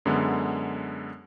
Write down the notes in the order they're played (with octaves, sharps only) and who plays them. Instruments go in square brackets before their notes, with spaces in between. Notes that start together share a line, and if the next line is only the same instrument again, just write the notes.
[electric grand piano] F#2 D3 G#3 B3